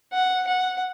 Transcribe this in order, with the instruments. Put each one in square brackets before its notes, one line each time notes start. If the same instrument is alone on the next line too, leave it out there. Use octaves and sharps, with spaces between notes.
[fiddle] F#5
F#5